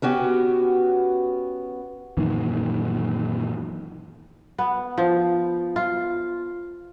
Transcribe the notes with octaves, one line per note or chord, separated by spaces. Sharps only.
B3 C#4 F#4 G4
F#2 A#2 D#3 E3
B3
F3
F4